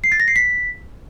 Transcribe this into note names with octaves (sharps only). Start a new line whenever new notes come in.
C7
A6
A#6
C7
B6